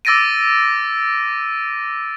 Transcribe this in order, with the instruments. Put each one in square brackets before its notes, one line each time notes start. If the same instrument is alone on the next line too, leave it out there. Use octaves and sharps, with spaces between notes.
[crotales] D6 E6 A6 A#6 D7 D#7